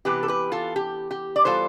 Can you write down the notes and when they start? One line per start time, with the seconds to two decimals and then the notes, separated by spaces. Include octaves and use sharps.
0.05 C3 E3 B3 G4 B4
0.23 A4
0.28 G4 B4
0.52 F4 A4
0.76 G4
1.11 G4
1.36 D5
1.45 E3 G3 B3 F4 A4 C5